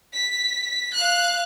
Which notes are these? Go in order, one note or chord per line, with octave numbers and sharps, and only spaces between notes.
B6
F5 F#6